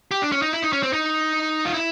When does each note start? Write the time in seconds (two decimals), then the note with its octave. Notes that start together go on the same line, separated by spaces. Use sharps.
0.11 G4
0.22 D4
0.32 C#4
0.42 D#4
0.52 E4
0.62 D#4
0.73 C#4
0.83 C4
0.93 D#4
1.65 F4
1.74 E4